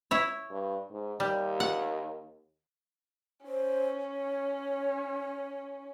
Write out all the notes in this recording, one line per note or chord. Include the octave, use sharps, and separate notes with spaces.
E4 C#5
G2
G#2
D#2 G3
F#5
C#4 C5
C#5